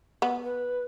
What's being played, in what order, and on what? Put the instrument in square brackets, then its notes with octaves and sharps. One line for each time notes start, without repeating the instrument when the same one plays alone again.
[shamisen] B3
[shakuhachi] B4